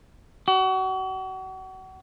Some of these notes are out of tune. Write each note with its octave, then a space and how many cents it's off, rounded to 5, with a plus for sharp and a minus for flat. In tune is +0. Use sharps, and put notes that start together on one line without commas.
F#4 +35